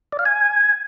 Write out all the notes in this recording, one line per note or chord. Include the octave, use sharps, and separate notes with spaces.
D5
F5
G#5